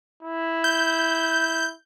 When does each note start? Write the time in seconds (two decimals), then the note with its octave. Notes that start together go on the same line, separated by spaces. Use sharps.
0.23 E4
0.64 G6